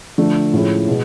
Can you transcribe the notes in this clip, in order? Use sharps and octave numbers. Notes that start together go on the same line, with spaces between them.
D3 F3 A3
A2 F3 G#3 C#4 E4
B2 G#3